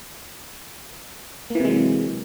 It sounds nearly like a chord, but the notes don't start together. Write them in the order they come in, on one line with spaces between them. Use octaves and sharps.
A#3 E3 C3 G#3 F#3